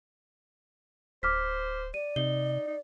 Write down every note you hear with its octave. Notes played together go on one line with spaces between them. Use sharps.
D1 C5 D6 F6 B6
D5 D#7
C3 D#4 G7
D#4